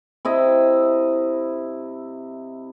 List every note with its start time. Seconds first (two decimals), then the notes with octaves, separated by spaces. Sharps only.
0.25 C3 E4 D#5 E5